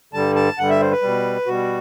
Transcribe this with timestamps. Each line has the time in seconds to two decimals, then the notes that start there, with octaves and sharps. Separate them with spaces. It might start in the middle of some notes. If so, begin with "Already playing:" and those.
0.13 G2 D3 G3 A5
0.36 A5
0.58 G2 D3 G3 F#5
0.70 E5
0.81 C5
0.91 B4
1.02 B2 G3
1.46 B2 G3 F#4